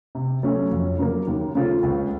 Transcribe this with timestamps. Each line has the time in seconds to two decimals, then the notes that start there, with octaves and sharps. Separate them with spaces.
0.15 C3
0.43 F#3 A3 C#4
0.71 F2
0.99 C#3 F#3 A#3
1.27 D#2
1.55 C#3 A3 C4 F4
1.83 C#2